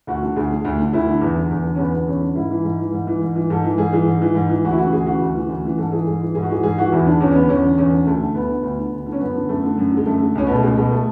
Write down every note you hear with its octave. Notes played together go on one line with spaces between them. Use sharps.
D2 F#4
D3
D2 G#4
D3
D2
D3
D2 E4
D3
E2
D3
E2
D3
C#4
E2 B3
D3 B3
E2 C#4
D3
G#2 E4
E3
G#2
E3
G#2
E3
G#2
E3
G#2 A4
E3
G#2 G#4
E3 G#4
G#2
E3
G#2
E3
D2 F#4
E4
C#3 E3 F#4
D2 G#4
C#3 E3 F#4
D2
E3
C#3
D2
C#3 E3
G#2 A4
E3 G#4
G#2 G#4
E3
G#2 G#4
F#4
E3 G#4
G#2 G#4
E3 F#4
E2 E4
D3 D4
E2 C#4
C#4
D3 B3
E2 C#4
D3
E2 C#4
D3
D2 A3
D3
D2 B3
D3
D2
D3
D2
D3
C#4
F#2 B3
D3
F#2 A3
D3
F#2
D3
G#3
F#2 A3
D3
C#2 C#4
B2 B3
A3
C#2 G#3
B2 G#3
A3